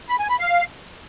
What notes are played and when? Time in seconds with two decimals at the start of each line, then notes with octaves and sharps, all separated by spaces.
0.09 B5
0.19 G#5
0.29 B5
0.40 F5